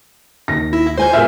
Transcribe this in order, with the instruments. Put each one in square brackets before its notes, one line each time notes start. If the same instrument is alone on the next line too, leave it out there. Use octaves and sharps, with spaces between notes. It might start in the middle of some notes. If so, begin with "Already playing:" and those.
[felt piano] D#2 [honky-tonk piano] A#6
[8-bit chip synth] E4
[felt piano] G#3 F4 [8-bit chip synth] C5 G#5 G6
[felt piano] B3 F6 [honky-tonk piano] G#4 E5